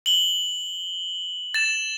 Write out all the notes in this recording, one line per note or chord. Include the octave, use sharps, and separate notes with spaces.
F#7 G7
A6 E7